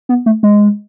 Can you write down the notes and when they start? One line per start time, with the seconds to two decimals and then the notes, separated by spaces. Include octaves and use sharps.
0.09 B3
0.26 A3
0.43 G#3